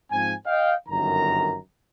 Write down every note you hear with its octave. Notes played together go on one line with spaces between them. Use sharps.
G#2 F3 C4 G#5
D#5 F5 G5
G1 F#2 D#3 A#5